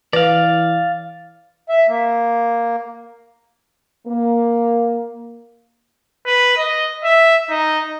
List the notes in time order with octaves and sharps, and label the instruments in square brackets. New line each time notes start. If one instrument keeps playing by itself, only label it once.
[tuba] E3 [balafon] B4 [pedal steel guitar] D5 F5
[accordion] E5
A#3
[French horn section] A#3
[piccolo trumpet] B4
D#5
E5
D#4